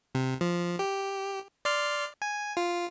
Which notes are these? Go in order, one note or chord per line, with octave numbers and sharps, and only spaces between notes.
C3
F3
G4
D5 C6 F6
G#5
F4